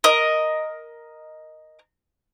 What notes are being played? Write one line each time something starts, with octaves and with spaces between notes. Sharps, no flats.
A#4 D#5